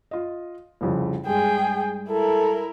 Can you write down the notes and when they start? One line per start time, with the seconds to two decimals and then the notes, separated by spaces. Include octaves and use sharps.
0.11 F4 D#5
0.81 C2 F2 C#3
1.26 G2 G#3 G#4 G5
2.09 E4 A4 A#4